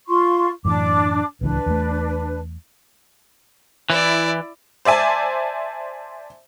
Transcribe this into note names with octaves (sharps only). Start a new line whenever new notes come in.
F4 C6 C#6
F#2 A2 E3 D4 D6
D1 C#2 E3 D4 B4
E2 A3
E3 E4 D5
C5 D5 E5 G#5 A5